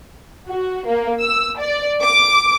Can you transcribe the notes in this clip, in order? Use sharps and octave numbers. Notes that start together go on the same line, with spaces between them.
F#4
A#3
E6
D5
D6